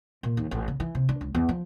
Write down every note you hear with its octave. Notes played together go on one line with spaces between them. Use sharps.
A#2
D#2
A1
C#3
E3
C3
D4
C#2
E2
F3